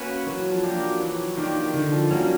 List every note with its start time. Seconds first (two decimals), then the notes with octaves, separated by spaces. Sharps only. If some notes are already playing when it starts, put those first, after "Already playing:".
Already playing: A#3 C#4 F#4 B4
0.27 E3 F#3
0.51 F3
0.63 A#3 D4 G4
0.76 F#3
1.00 E3 F#3
1.37 D#3 A#3 D4 G4
1.74 D3 D#3
1.92 F3
2.10 F#3 G3 A#3 C#4